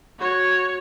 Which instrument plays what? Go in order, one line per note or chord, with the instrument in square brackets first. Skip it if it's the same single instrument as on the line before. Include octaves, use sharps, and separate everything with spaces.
[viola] F#4 C#5